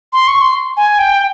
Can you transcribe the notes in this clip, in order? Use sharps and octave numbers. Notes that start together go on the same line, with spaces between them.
C6
C#6
C6
G#5
G5